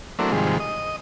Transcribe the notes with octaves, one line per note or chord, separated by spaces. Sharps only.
F#3 A3 A#3 C4 D4 E4
G#2 C3 D#3 F3 G3 G#3
D#5